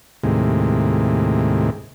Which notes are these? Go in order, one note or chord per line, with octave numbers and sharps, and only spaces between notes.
D#2 A2 C3 G#3